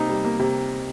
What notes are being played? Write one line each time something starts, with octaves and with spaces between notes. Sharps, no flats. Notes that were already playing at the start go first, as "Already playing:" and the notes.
Already playing: C3 A#3 D#4
G3
A#3
C3